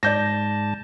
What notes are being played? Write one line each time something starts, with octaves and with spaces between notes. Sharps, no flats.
G#2 D5 A5 G6 A#6